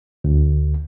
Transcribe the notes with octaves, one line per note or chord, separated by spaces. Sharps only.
D2